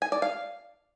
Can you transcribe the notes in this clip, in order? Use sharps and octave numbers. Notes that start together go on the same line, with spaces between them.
G#5
D5
F5